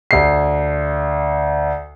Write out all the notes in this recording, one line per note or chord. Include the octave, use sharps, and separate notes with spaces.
D2 C7